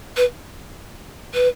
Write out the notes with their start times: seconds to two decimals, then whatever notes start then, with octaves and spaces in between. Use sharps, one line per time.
0.17 B4
1.34 B4